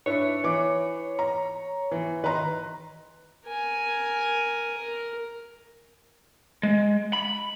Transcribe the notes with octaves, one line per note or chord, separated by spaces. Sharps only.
D4 E4 B4 C#5
E3 D6
A#5
E3
D#3 B4 A#5 C6
A#4 G#5
A#4
G#3
B5